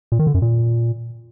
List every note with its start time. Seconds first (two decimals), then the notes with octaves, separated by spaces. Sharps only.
0.12 A#2
0.19 D#3
0.27 D3
0.34 F#2
0.42 A#2